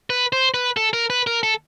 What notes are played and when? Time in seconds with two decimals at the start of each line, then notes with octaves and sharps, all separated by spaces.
0.10 B4
0.33 C5
0.54 B4
0.77 A4
0.93 A#4
1.10 B4
1.27 A#4
1.43 A4